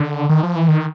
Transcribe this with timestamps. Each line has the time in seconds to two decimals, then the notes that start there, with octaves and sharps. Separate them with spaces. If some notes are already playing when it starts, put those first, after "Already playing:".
Already playing: D3
0.29 D#3
0.43 F3
0.56 E3
0.68 D#3